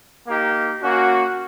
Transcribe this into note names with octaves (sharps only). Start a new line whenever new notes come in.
A#3 D#4 G4
A#3 C#4 F#4